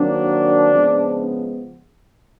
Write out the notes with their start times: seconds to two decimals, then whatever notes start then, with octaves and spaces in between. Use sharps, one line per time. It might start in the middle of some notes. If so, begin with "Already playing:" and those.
Already playing: D#3 F#3 A#3 C4 D4
0.73 C#3 F3 G#3 B3